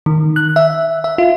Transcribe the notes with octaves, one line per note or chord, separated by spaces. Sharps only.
D#3
F#6
E5
E5
F4